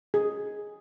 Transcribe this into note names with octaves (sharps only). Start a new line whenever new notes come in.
G#4